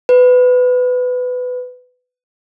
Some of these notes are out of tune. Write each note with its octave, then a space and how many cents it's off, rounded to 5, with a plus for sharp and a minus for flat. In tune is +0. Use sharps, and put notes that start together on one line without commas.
B4 +20